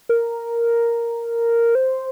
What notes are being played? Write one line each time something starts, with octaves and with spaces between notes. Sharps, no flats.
A#4
C5